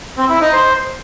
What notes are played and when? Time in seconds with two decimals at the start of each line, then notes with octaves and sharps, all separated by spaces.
0.17 C4
0.29 E4
0.41 D#4
0.53 C5